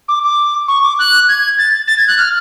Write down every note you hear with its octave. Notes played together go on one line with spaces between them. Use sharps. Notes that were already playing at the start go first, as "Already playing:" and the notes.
D6
D6
C#6
D6
F#6
G#6
A6
A6
G#6
F#6
F6